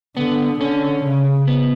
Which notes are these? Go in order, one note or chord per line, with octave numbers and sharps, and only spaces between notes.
D3 B3
D3 C#4
C#3
B3